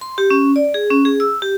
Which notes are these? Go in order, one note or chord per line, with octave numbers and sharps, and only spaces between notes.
C6
G4
C#4
D5
G#4
C#4
G#4
E6
G4